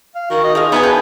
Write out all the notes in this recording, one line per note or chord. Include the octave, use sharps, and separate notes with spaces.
F5
D#3 F#4
D#5
F3 G#4 D#5 F5
B3 D#4 C#5 G#5
D4 G5